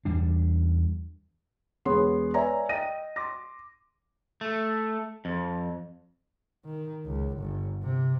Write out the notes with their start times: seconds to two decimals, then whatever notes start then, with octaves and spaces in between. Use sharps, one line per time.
0.05 E2 G3 D4
1.85 E1 B3 G#4 C#5 F#5 C6
2.34 B4 C#5 D5 E5 G#5 A#5
2.69 D#5 G5 A#6 D#7
3.16 C6 D6 A#6
4.41 A3
5.25 F2
6.65 D#3
7.05 C#2
7.38 G1
7.83 C3